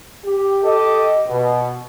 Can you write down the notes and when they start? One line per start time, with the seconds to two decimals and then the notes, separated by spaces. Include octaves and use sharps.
0.25 G4
0.63 G4 A4 D#5
1.27 B2